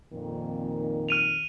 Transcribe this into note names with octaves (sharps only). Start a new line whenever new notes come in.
F2 A#2 D#3
F6 D#7 F7